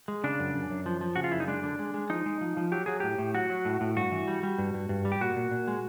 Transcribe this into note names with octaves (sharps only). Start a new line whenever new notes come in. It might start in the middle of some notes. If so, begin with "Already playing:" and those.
G#3
C#3 D4
F#2
F#2
F#2
F3
F3
C#3 F#4
F4
F#2 E4
D#4
G#3 D4
D3
G#3
G#3
F3 D#4
G#3
F3
F3
F#3 G4
F#3 G#4
A2 G4
A2
F#3 F#4
F#3
A2
A2
G2 F#4
E3
G3
G3
G2
G2
G2
G3
G4
A#2 F#4
A#2
A#2
G#3